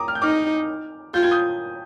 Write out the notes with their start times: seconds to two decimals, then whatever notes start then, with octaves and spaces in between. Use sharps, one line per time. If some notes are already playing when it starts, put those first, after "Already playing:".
Already playing: A#5 D6 D#6
0.08 F6
0.15 G6
0.22 D#4 D6 F6
1.14 F4 G6
1.22 G#6
1.31 D#6 G6